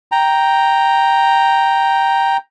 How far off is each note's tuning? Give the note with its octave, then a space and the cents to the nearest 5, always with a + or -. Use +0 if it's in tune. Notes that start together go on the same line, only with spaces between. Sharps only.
G5 +0 A#5 +0